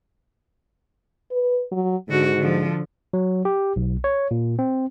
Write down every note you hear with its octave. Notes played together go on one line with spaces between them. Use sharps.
B4
F#3
G#2 D3 F#4
D3 F3
F#3
G4
B1
C#5
A#2
C4